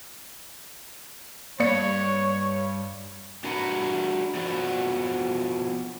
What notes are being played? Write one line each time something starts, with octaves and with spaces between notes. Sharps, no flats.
G2 A#3 C#5 D5 C#7
D4 F#4 A#4 B4 F#5
F3 B3 F#4 D5